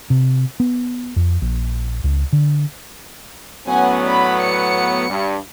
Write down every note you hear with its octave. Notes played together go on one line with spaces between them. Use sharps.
C3
B3
F2
A#1
C#2
D3
A2 F#3 B3 C#4 F#5 G#5
D5 B5
C#7
G2